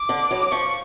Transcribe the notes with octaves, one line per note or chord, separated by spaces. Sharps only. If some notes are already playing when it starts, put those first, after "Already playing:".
Already playing: D6
D3
F#3 B3
F3 C#6